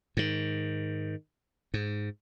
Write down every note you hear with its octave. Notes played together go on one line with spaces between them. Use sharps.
G#2 D#3
G#2